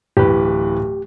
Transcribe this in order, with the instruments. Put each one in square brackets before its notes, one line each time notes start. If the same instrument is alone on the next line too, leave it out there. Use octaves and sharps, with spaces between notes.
[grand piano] D1 E3 B4 [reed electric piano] G4